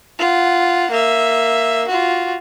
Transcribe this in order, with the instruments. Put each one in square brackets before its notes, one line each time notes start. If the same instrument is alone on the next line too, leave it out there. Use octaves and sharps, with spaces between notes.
[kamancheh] F4 F#5
A#3 E5
F4 F#4